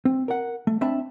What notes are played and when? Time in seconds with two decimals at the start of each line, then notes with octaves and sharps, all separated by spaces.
0.05 C4
0.28 A#4 F#5
0.67 A3
0.81 C4 D4 E5 A5 B5